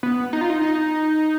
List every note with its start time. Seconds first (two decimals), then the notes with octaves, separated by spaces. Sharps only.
0.03 B3
0.33 D#4
0.41 F4
0.50 D#4
0.61 D#4